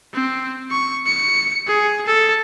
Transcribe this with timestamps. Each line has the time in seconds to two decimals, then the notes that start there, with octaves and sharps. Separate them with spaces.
0.14 C4
0.71 C#6
1.07 C#7
1.67 G#4
2.07 A4